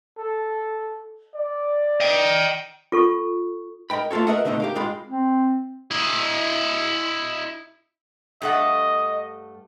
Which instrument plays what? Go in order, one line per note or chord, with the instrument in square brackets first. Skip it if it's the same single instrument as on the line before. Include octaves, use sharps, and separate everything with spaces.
[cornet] A4
D5
[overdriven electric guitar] D#5 G5
[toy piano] F4 A4 C#6
[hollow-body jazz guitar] A#4 D#5 G5 B5
A3 A#3 F4 A4 C#5
A#4 B4 D#5 E5 F#5
B2 D3 A3 C4 D#4
G4 A#4 F5
G#2 G#3 F4 G5 B5
[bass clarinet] C4
[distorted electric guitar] E4 D#5
[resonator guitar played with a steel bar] G2 A3 F#5 [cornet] D#5